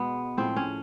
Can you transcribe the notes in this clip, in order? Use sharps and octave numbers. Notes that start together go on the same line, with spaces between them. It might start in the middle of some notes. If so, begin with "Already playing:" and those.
Already playing: B2 G#3 B3
A2 F3 G#3 C4
C#4